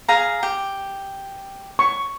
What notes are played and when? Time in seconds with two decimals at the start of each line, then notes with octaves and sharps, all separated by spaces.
0.08 G#4 F5 A#5
0.43 G4
1.79 C#6